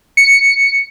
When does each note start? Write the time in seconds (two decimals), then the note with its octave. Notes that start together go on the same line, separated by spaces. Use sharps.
0.17 C#7